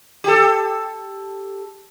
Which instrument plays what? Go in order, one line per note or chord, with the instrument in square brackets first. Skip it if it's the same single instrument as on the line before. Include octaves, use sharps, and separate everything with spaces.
[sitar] G4 A4